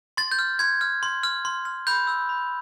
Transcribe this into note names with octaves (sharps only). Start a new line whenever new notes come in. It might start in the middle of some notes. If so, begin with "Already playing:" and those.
C6 A6
G6
F6
C6 G#6
F6
C6
F6
C6
F6
B5 G6
E6 G6
B5